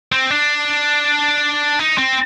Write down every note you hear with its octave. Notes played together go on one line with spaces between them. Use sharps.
C4
D4
D#4
C4